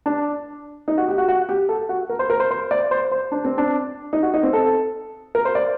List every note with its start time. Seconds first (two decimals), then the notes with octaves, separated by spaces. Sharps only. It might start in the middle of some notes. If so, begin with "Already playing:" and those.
0.06 D4
0.88 D#4
0.98 F#4
1.08 G4
1.18 F#4
1.28 F#4
1.49 G4
1.69 A4
1.89 F#4
2.09 A#4
2.19 C5
2.30 A#4
2.40 C5
2.51 C5
2.71 D5
2.91 C5
3.11 C5
3.32 D4
3.45 C4
3.58 D4
4.13 D#4
4.23 F#4
4.34 D#4
4.43 C4
4.53 A4
5.35 A#4
5.45 C5
5.55 D5